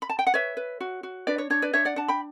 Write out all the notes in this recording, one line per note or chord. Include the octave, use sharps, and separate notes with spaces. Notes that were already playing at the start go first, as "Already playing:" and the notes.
B5
A5
G5
F#5
B4 C#5 E5
B4
F#4
F#4
D4 B4 D5
C#5
D4 C#5
B4 D5
D4 C#5 E5
D5 F#5
D4 F#5 A5
G5 B5